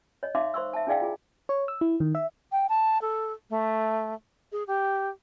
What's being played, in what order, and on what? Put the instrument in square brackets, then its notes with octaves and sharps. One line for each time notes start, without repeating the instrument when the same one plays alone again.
[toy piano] C#5 D#5
D#4 E5 F5 C6 D6
C5 C6 C#6 E6
E5 A5
D4 E4 G#4 D5 F5 G5
F4 G#4
[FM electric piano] C#5
E6
E4
D#3
E5
[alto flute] G5
A5
A4
A3
G#4
G4